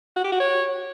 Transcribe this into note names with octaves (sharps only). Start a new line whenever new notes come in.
F#4
G4
F#4
C#5